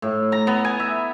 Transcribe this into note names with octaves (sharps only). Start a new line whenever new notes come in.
A2
A#5
B3
G#5
E5